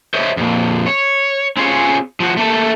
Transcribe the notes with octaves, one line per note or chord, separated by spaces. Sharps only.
C5 C#5 D#5 E5
F2 A#2
C#5
C4 C#4 F4 G#4 C#5
F3 F#4
A3 A#3 A4